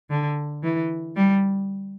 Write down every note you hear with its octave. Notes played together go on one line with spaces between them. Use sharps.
D3
E3
G3